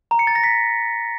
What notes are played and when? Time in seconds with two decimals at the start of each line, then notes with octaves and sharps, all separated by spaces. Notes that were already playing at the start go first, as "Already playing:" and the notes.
0.11 A#5
0.19 C#7
0.27 A6
0.35 A#6
0.44 B6